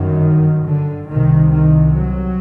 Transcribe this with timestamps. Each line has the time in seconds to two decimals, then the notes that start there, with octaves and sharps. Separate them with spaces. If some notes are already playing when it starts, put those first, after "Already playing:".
Already playing: G1 F#2 D#3
0.66 D3
1.09 C2 C3 D#3
1.52 D#3
1.96 F#3